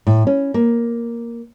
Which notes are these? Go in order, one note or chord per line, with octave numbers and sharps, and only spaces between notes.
A2
C#4
A#3